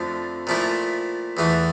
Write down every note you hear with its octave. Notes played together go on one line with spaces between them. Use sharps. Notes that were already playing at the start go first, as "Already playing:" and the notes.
Already playing: F2 D3 F3 A3
A#2 F3 A3 E4
E2 E3 A3